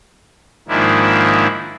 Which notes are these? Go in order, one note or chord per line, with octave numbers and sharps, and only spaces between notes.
G#2 D#3 F3 A#3 D4 E4